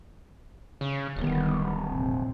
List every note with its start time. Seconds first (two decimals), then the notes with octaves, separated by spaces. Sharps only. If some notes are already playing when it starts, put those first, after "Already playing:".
0.81 C#3
1.16 D1 D#3 G3 B3
1.85 F1 A#1 C4